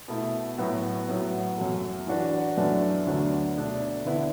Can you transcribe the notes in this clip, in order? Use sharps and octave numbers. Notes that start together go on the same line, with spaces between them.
B2 A3 E4
A2 F#3 B3 F#4
A2 F#3 B3
F#2 F#3 A3
E3 D4 F#4 B4
F#2 F#3 A3 D4 B4
D2 D3 F#3 B3 D4
B2 A3 D4 A4
D3 B3 E4 B4